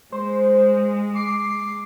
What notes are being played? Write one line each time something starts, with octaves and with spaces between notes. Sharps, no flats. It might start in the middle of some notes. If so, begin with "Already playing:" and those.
G#3 C5
D6 C7